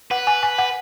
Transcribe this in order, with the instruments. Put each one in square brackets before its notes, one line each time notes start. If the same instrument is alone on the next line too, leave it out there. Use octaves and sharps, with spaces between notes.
[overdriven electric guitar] B4 [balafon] F#5
[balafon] G#5
G#5
F#5